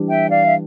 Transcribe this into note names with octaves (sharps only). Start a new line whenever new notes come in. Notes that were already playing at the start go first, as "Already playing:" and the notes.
Already playing: E3 G3 D4 G4
E5 G5
D5 F5
E5